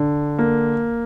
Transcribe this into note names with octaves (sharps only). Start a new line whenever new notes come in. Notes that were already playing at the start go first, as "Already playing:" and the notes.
Already playing: D3
A#3